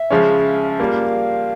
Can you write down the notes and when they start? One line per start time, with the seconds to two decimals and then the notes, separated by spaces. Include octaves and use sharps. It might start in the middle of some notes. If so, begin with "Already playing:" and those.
Already playing: E5
0.10 C#3 F3 G#3 C#4
0.72 E5
0.80 G3 A#3 F4 F5